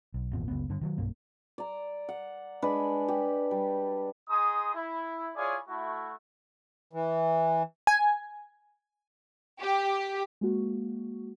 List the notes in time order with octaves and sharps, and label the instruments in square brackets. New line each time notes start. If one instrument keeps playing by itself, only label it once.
[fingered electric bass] B1
G#1 E2 A#2
F#1 C#2 B3
G2 D3
D#3 F3 F#3
B1 G2 A#3
[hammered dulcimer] D5 A#5
F#5
G#3 D4 B4
G4
G3
[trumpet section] D#4 G#4 C6 D#6
E4
E4 F4 G#4 C#5 D5 G#5
A3 E4 F#4
[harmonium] E3
[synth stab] G#5
[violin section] G4
[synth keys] G#3 A#3 F#4